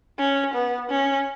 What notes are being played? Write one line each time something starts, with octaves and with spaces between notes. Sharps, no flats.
C#4
B3
C#4